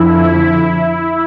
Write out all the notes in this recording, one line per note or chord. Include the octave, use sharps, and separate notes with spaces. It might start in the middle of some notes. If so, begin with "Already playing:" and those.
Already playing: F2 D3 F3 E4